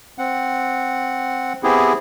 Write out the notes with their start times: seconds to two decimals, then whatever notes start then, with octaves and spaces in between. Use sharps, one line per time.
0.18 C4 F#5
1.63 B3 C4 E4 G4 G#4